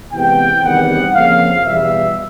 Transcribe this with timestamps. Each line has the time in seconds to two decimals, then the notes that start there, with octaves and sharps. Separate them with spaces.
0.11 C3 E3 G#3 B3 G5
0.62 E2 C3 D#3 G3 B3 F#5
1.12 F2 C#3 F3 A#3 F5
1.63 E2 B2 G3 E5